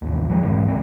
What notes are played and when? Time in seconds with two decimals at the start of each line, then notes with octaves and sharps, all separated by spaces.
0.02 A1 D#2
0.29 D1 F2 E3 G#3
0.43 D#1 G#2 E3 G#3
0.68 C#2 C4